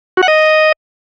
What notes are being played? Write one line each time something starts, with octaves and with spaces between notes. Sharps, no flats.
F#4
F#5
D#5